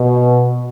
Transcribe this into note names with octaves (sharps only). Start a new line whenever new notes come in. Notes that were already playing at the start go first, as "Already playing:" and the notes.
Already playing: B2